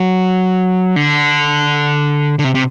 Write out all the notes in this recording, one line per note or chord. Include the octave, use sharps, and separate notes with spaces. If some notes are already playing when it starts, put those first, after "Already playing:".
Already playing: F#3
D3
D3
C3
C3